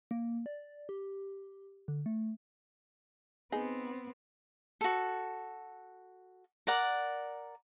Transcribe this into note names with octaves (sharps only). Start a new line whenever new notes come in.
A#3
D5
G4
D3
A3
B3 C4 D#4 G#4
F#4 A4
A#4 D5 F#5